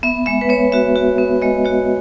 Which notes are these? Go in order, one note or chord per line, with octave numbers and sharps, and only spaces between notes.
B3 E5
G#3 E5
B4
B3 C#5
F#4 E5
F#4
B3
G#3 D#5
F#4 C#5